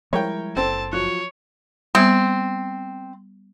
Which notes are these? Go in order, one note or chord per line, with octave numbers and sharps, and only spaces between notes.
F3 G3 G#3 E4 A#4 C#5 G5
F#1 C4 A4 A5
F3 F#3 C#5 F#6
G3 B3 C4